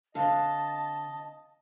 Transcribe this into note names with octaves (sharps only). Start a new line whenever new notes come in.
D3 C4 D#5 F5 A5